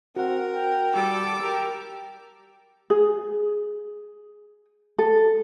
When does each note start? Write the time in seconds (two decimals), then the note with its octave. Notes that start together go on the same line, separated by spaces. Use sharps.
0.16 C4 F#4 A#4 F#5
0.54 G5
0.93 G3 A4 D6 E6
1.41 G4 A#4 G5
2.90 G#4
4.98 A4